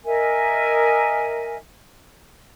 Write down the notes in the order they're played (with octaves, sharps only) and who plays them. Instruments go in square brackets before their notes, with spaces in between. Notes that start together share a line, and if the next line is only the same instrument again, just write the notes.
[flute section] A#4 D#5 E5 G#5